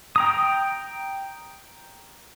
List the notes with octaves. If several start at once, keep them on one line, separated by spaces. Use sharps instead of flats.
G5 A#5 D#6